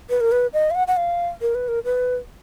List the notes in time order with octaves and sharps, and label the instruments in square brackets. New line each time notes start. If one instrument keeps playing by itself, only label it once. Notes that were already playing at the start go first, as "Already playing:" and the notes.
[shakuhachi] B4
A#4
B4
D#5
F5
F#5
F#5
F5
A#4
B4
A#4
B4